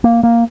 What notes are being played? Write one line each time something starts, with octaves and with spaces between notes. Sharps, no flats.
A#3
A#3